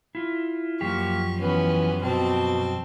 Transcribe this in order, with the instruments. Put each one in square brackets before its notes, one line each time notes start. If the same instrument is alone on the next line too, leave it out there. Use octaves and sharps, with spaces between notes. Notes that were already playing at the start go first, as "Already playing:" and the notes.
[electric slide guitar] E4 F4
[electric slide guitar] F#2 F3 G4 [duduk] A#3 [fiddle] C#6
[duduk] E3 [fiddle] B3 C#4
[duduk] B2 [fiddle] C4 A5